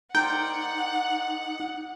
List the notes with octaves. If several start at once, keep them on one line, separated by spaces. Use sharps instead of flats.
D#4 A#4 C5 D5 F#5 G5